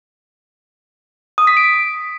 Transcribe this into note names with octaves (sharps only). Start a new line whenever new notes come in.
D#6
B6
D7